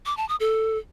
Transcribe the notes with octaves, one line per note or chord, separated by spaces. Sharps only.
D6
A5
D#6
A4